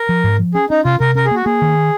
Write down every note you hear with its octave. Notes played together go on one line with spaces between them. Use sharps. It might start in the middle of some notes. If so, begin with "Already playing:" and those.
Already playing: A#4
F3
G#2
F3
C#4 G#4
C#4 D#4
C3 F4
C3 A#4
C#4 A#4
G#4
A#3 F#4
A#3 G#4
D#3